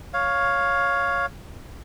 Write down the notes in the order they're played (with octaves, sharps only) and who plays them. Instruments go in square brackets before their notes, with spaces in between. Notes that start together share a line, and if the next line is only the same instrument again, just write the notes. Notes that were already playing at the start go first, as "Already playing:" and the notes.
[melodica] C#5 F5